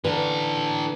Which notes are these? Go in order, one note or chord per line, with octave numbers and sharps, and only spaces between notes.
A#2 D3 E3 A4 B4